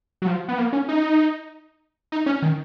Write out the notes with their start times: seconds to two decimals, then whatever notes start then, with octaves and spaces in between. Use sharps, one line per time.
0.22 F#3
0.27 F3
0.48 B3
0.58 A#3
0.73 C#4
0.89 D#4
2.12 D#4
2.26 C#4
2.42 D#3